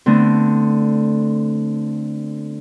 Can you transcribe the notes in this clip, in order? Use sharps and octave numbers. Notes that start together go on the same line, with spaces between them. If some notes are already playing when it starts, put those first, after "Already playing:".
D3 A3 B3 C4